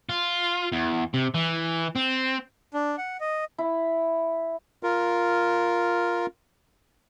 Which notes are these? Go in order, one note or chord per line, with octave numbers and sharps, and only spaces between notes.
F4
E2
C3
E3
C4
D4
F#5
D#5
E4
F4 A#4